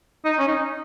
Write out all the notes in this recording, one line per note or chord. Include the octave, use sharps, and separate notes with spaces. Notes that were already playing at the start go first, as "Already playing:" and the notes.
D#4
C#4
D#4